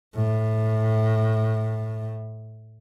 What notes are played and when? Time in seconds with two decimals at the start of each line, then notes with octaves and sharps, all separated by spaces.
0.16 A2